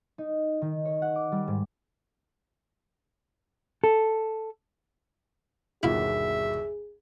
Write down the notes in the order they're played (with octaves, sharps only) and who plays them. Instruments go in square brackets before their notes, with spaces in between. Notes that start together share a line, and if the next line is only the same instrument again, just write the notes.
[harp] D#4
D#3
C#5
F#5
D6
G3
G#2
[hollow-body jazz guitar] A4
[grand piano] G1 D#2 B2 [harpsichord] E4 F4 [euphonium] G#4 [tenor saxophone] E5